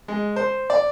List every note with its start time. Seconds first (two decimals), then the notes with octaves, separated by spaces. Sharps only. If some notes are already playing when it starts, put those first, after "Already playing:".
0.08 G#3
0.36 C5
0.70 D5